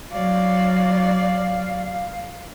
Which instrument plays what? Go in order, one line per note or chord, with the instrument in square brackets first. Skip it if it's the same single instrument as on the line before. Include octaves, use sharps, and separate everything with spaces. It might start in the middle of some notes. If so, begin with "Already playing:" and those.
[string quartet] F#3 D5 [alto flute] F5